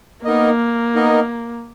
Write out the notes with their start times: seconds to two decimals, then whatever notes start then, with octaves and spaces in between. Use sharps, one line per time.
0.25 A#3 B3 D#4 A#4 D#5
0.95 B3 D#4 A#4 D#5